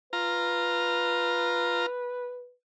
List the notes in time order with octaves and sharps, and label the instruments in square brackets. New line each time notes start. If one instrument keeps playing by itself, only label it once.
[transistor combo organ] F4 A#5 [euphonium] B4